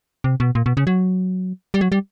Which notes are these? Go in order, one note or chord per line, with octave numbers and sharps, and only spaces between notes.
C3
B2
A#2
B2
C#3
F#3
G3
F#3
G3